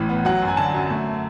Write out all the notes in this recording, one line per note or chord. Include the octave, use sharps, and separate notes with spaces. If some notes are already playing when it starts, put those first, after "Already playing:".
Already playing: A1 A2 E3
B3
F#3 F#5
F#2
G#5
D3 A5
F#2
A3